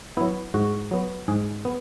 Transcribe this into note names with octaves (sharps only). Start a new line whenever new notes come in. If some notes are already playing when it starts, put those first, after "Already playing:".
F#3 B3 E4
G#2 F#4
F#3 B3
G#2 G#4
B3